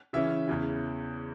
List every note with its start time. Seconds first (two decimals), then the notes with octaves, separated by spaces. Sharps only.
0.13 C#3 E3 C#4 E5
0.47 E2 C#3 E3